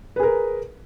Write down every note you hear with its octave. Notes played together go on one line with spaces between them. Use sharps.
G#4 A#4 B4